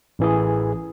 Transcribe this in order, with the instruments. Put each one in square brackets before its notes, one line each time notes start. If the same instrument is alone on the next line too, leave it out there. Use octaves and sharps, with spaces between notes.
[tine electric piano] A1 E3 G#4